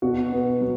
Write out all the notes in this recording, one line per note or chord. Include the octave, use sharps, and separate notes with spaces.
B2 F#4
B3
F#3